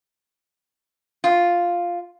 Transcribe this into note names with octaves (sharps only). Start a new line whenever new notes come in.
F4